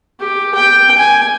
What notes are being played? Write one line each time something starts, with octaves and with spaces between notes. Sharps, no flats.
G4
G5
G#5